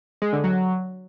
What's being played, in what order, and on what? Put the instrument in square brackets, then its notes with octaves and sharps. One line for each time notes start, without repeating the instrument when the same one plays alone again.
[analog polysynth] G#3
D3
F#3